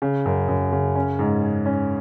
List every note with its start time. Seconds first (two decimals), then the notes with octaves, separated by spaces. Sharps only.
0.02 C#3
0.26 F#2
0.49 F#2
0.72 C#3
0.95 C#4
1.19 G#2
1.42 G#4
1.66 C#4